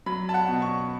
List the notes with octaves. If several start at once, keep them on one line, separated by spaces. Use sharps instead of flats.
F#3 B5
A5
F#5
B2
C#6